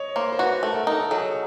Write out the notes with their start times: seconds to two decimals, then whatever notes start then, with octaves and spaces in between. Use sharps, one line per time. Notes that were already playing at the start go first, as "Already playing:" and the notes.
Already playing: C#5 D#5
0.16 A#3 C5
0.32 C5
0.39 F#4 B4
0.63 A3 A4
0.73 A#4
0.82 A4
0.87 D#4 A#4
0.99 A4
1.11 F#3 G#4